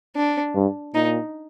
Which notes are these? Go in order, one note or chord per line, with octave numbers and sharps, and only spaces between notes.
D4
G2
A#2 D#4